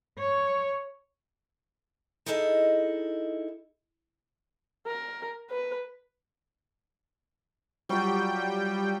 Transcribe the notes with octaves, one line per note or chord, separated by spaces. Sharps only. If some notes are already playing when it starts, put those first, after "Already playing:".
C#5
D#4 E4 G#4 A4 D5 D#5
A#4
B4
F#3 G3 F4 G5